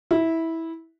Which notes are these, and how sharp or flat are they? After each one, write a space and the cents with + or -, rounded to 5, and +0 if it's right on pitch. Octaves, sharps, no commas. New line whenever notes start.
E4 -15